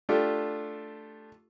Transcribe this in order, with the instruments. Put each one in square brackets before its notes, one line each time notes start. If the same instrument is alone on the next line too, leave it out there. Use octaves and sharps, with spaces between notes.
[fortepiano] A3 D4 F4 G4 A4